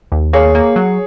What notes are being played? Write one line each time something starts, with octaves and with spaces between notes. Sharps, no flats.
D#2
A#3 G#4 C#5
A#3
F#3